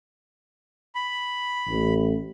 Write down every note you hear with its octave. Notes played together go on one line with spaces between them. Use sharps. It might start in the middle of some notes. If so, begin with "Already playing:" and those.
B5
A1